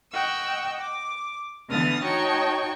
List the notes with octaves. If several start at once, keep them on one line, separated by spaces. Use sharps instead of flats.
D#5 F#5 G5 C#6 E6
D6
D3 E3 B3 D#6 F6 A6
D#4 F#4 C#5 G5 A5 C#6